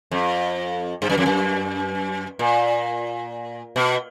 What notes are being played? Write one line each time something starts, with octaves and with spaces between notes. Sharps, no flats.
F2
G2
F#2
F2
F#2
A#2
B2